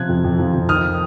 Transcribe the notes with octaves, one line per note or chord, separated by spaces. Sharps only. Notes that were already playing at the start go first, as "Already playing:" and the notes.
Already playing: C3 F3 F#6 G#6
F2
F2
F3
F2
D#3 D#6 F6